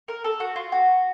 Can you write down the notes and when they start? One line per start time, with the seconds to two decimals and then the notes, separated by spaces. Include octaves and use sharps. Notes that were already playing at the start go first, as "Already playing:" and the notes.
0.08 A#4
0.24 A4
0.40 F#4
0.56 F4
0.72 F#4